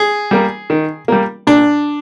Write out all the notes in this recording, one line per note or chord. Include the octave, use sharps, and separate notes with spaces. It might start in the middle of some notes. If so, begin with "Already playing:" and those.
Already playing: G#4
G3 A#3
D#3
G3 A#3
A#2 D4